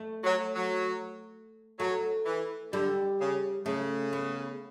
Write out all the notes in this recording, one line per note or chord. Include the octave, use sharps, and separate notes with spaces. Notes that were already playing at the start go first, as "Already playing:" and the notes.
Already playing: A3
F#3
F#3
F#3 A3
E3
D3 G3
C#3
C#3 A3
B3